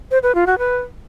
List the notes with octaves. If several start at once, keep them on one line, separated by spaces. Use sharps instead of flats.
C5
B4
F4
F#4
B4